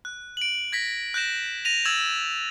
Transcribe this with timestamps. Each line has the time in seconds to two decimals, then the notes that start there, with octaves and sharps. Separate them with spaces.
0.05 F#6
0.37 D7 F#7
0.73 G#6 A#6 B6
1.14 F#6 G6 A#6 E7
1.65 A#6 D#7 F7
1.85 E6 G#6 A6 E7 F#7